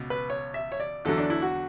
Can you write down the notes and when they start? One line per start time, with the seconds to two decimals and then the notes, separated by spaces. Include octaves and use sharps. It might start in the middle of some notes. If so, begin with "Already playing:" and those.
Already playing: C#2 B2
0.10 B4
0.30 C#5
0.54 E5
0.72 C#5
0.80 D5
1.05 E2 D3 F#3 A4
1.18 D4
1.30 E4
1.42 F#4